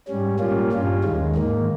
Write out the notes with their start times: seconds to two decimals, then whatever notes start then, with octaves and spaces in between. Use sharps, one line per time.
0.08 G#2 G3 C#4
0.40 A#2 G3 A#3 C#4 F4
0.72 G2 G3 C#4 F4
1.04 D#2 D#3 G#3
1.36 G#2 D#3 A#3